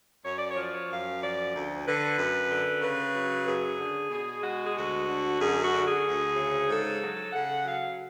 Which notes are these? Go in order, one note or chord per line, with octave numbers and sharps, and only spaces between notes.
F#2 C#5
D5
C#5
F3 D5
C#5
F#2 F5
F3 D5
D2
D3 B4
F#2
D3
C#3 B4
F#3
F#2 G#4
D3
B2 G#4
G#3 F#4
G#4
D2 F#4
D3
F#2 G#4
F#4
D3
G#4
D2
C#3
G#2 A4
F#3
C#3 F#5
F#3 F5